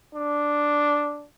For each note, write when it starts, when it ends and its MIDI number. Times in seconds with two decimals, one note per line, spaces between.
0.15 1.26 62